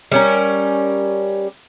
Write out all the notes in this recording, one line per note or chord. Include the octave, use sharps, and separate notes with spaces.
G3 C#4 A#4